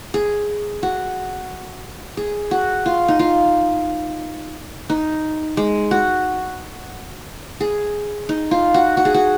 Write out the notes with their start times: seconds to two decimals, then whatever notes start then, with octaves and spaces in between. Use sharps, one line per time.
0.14 G#4
0.83 F#4
2.17 G#4
2.51 F#4
2.86 F4
3.08 D#4
3.19 F4
4.90 D#4
5.57 G#3
5.91 F#4
7.61 G#4
8.29 D#4
8.51 F4
8.74 F#4
8.97 F#4
9.05 G#4
9.14 F#4